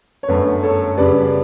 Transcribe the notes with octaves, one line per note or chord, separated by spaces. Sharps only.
C#5
G1 F#2 D3 A3 B4
A4 C#5
F#2 C#3 G3 B4 D5